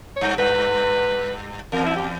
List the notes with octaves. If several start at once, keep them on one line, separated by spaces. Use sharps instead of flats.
C#5
G2
G2 B4
E2 A#4
E4
G4